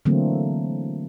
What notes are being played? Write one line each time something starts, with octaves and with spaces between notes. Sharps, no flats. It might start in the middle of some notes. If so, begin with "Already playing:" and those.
D3 E3 F#3 A3 A#3 C4